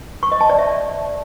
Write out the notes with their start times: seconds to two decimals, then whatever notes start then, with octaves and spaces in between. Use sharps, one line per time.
0.23 C#6
0.32 D#5
0.41 A5
0.50 D5
0.58 E5